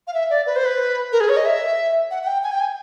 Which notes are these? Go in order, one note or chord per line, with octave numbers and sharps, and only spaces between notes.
F5
E5
D5
B4
C5
B4
A#4
G#4
C#5
D#5
E5
F#5
F#5
G5
G#5
G5
G#5